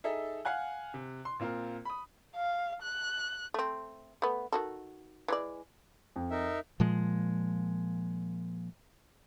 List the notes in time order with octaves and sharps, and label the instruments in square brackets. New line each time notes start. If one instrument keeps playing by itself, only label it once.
[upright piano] D#4 G#4 A4 E5
F5 F#5 G#5 F#6
C3
C6
A#2 C4 F4 A#4
B5 D#6
[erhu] F5
F#6
[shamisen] A3 C4
A3 B3
D#3 F#4 A4
E3 G#3 D5
[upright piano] F2
[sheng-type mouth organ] D#4 A#4 E5
[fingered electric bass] A#2 F3 G#3